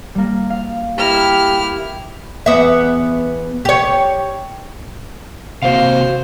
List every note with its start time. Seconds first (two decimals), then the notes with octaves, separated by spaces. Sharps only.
0.15 G3 A#3
0.50 F5
0.98 E4 G4 A#4 F6
2.46 E2 B3 E5
3.65 G4 C#5
5.62 C3 A#3 F#4 C5 F5